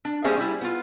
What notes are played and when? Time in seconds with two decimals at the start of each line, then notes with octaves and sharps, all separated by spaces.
0.05 D4
0.24 G3 A#3 C#4 G#4 C5 E5
0.38 G3 E4
0.61 B3 F4